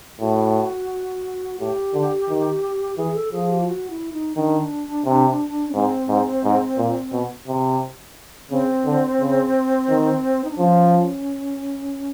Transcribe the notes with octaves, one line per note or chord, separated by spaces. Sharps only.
A2 F#4
A2 G4
D3
D#3
E3 G#4
A4
F3 G#4
G4
F4
F#4
E4
D#4
D#3 D4
C3
C#4
G#2 C4
G#2
G#2
A#2
B2
C3
C#3 C4
D3
C#3
D#3
D#4
D4
F3 C#4